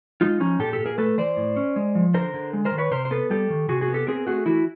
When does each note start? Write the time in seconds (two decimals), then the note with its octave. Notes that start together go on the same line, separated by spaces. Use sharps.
0.21 G#3 D#4 F4
0.40 F3 C#4 D#4
0.59 A#2 G4 A4
0.73 G4 A4
0.79 A#2
0.86 G#4 A#4
0.98 A3 A4 B4
1.18 E3 C5 D5
1.37 A2
1.56 C#4
1.76 G#3
1.95 F3
2.14 D3 A#4 C5
2.34 D3
2.53 G#3
2.65 A#4 C5
2.72 D#3
2.78 B4 C#5
2.91 C3 A#4 C5
3.05 C5
3.11 B3 A4 B4
3.30 G3 G4 A4
3.50 D#3
3.68 C3 F#4 G#4
3.81 F#4 G#4
3.88 B3
3.94 G4 A4
4.07 C4 G#4 A#4
4.27 A3 F#4 G#4
4.46 E3 E4 F#4